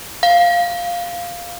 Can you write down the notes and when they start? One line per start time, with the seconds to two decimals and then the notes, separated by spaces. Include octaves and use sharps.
0.23 F5